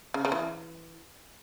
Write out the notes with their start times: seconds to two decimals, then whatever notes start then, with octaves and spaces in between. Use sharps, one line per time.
0.14 C#3
0.25 C#3
0.32 E3